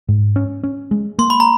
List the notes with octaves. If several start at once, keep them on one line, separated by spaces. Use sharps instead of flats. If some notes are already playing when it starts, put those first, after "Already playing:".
G#2
C#4
C#4
G#3
A#3 C6
B5
A#5